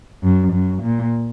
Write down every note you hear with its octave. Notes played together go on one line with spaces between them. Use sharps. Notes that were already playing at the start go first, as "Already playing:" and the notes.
F#2
F#2
A#2